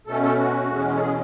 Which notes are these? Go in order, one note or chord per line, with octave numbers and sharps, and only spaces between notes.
B2 A3 C#4 A4
A4
F#4
E2 B2 G#3 C#4
A4
G#4